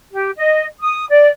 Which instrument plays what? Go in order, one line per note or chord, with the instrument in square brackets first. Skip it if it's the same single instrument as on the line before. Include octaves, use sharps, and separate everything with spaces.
[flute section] G4
D#5
D#6
D5